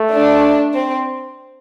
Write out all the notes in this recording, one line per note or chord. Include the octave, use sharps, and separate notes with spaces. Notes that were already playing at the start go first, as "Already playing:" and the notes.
Already playing: A3
D4
C4